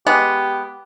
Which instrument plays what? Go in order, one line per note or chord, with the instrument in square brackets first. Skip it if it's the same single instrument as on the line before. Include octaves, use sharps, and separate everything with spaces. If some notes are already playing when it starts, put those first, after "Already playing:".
[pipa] G#3 B3 [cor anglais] G4